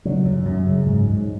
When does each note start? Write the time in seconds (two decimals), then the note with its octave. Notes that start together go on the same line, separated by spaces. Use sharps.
0.05 C#3 F#3
0.25 F#2
0.45 F#2
0.66 C#3
0.86 G#2
1.08 G#2